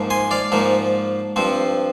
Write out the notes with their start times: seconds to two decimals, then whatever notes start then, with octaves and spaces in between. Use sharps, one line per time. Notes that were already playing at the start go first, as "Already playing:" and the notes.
Already playing: G#2 F3 A#3
0.10 G#5 C6
0.31 D5 F5
0.52 G#2 F3 A#3
1.36 G2 F3 C4